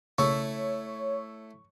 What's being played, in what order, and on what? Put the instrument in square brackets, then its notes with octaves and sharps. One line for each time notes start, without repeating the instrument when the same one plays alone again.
[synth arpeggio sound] B1 C#3 A#3 [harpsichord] A3 E4 [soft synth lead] C#5 [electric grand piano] C#6